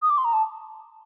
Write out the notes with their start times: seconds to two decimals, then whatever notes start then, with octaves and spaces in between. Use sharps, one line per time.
0.02 D#6
0.10 D6
0.18 C6
0.25 A#5
0.33 A5